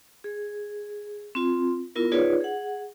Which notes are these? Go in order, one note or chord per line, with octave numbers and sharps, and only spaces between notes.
G#4
C4 F4
B3 E4 F4 A#4
D#4 F4 G#4 B4 C#5 D5
G#4 F#5